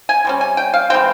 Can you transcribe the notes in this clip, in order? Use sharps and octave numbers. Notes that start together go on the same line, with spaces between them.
G#5
C3 G3 C#4
G#5
G5
F5
E3 G#3 C4 G5